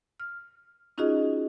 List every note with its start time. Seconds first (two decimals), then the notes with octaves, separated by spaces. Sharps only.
0.20 F6
0.98 C#4 D#4 F4 F#4 G#4 D#5